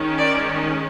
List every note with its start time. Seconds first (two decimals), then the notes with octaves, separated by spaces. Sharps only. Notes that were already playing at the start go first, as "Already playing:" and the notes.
Already playing: D#3 G#3 C#4
0.19 D5